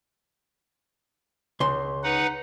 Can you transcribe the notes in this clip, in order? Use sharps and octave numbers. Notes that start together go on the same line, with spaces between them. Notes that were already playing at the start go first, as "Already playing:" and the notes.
C#2 C6
D#4 B4 F#5